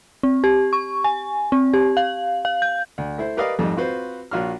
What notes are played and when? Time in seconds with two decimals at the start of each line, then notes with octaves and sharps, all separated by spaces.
0.23 C4
0.44 G4
0.73 C#6
1.04 G#5
1.52 C4
1.74 G4
1.97 F5
2.45 F5
2.62 G6
2.98 D2
3.18 A3 E4 C5
3.37 G4 A#4 B4 D5 D#5 F5
3.59 F2 G#2 G3 A3
3.76 C4 F4 F#4 B4 C5
4.31 A#1 F4 F#4 C#5 F6